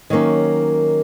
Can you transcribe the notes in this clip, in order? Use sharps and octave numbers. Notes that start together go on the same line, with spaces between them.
D#3 F#3 A#3 C#4 C#5